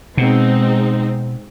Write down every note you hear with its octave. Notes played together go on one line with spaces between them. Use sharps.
B2 G#3 C4 D#4